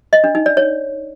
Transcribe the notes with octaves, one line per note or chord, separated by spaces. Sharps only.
D#5
D4
D#4
D5
C#5